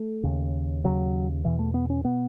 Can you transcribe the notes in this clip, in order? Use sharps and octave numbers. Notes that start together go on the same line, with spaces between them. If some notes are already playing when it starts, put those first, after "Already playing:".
Already playing: A3
D#2 C#3
D#2 C#3 F#3
E2 B2 E3
A3
B3
C#4
B2 B3